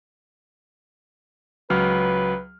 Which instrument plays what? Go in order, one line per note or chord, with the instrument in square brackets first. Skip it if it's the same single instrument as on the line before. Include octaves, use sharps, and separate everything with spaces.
[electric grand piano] C#2 F#3 F6 [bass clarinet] B4